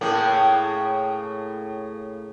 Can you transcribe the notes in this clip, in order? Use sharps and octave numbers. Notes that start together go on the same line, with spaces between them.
A2 C#3 A#3